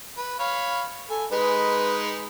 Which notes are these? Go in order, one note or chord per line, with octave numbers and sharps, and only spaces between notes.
B4
C#5 F5 B5
A4 G#5
G#3 D#4 B4 B5